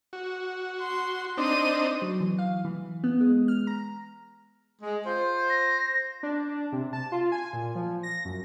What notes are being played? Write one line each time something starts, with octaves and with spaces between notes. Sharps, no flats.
F#4
C6
C4 D4 D#4 C6 D#7
F#3
E3
F5
E3
B3
G#3
F6
A#5
G#3
F4 C5
A#6
D4
C3
A5
F4
G#5
A#2
F3
A#6
F#2